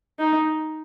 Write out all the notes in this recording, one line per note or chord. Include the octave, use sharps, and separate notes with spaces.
D#4